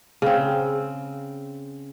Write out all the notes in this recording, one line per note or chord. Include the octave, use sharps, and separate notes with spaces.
C#3 C4